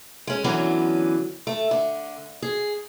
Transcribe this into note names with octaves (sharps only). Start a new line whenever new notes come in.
G#3 C#4
D3 E3 F#3 B3 C#4
A3
D3
G#4